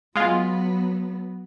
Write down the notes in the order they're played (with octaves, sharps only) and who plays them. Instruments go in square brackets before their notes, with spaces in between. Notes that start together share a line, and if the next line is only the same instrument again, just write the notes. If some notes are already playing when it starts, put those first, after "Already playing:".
[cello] F#3 B3 [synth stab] G#3 F4